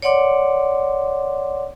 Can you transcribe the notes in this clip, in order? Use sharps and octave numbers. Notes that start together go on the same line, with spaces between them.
C#5 D5 F#5 C6 D6